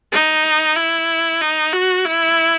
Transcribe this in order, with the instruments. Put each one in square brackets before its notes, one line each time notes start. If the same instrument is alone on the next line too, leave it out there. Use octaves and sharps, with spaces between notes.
[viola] D#4
E4
D#4
F#4
E4